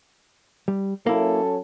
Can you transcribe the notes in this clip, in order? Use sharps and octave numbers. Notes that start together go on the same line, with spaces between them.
G3
F#3 A#3 C#4 E4 A4